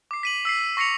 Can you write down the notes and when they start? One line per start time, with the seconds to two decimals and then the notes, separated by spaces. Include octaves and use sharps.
0.11 D6 C7
0.23 B6 D#7 F#7
0.45 E6 B6 C7
0.77 C#6 A#6 C7 C#7 F7